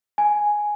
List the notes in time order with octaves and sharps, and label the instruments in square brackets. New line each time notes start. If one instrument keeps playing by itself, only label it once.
[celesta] G#5